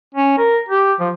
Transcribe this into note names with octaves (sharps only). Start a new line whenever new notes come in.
C#4
A#4
G4
F3